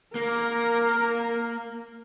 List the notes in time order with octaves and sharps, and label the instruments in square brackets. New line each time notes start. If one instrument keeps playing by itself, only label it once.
[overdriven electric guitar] A#3 [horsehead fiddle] A#4